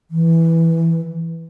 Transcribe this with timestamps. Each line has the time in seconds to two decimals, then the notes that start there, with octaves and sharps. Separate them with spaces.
0.11 E3